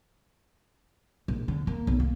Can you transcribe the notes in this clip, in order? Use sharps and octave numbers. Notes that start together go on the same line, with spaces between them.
A#1
D3
A#3
B1
A#3